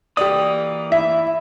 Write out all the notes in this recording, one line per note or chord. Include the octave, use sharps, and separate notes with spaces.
E3 A#3 G4 D5 D#6
E4 E5